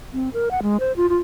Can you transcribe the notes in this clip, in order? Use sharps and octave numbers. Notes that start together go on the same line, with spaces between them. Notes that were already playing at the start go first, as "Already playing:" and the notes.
C4
A#4
F#5
G#3
C5
F4
F4